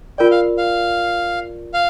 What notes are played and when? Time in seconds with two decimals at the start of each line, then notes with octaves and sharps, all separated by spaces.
0.18 F4 A#4 D5 G5
0.31 F5
0.58 F5
1.74 F5